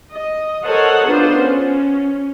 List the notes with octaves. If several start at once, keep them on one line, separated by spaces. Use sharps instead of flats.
D#5
A4 A#4 C5 C#5 D#5 F#5
B3 D4 F4 C5
C#4